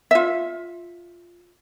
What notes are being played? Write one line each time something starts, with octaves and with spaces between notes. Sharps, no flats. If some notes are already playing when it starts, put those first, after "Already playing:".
F4 E5